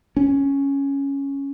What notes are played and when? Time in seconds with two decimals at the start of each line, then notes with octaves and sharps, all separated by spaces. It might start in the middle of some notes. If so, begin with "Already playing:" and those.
0.17 C#4